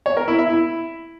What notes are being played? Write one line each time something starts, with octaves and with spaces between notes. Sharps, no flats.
C#5
A#4
E4
E5
E4